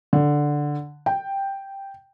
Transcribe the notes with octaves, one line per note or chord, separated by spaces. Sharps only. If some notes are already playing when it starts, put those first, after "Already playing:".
D3
G5